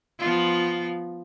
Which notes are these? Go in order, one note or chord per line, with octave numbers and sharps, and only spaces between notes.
F3 B3 F4